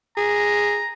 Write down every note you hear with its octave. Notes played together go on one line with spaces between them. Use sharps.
G#4 A#5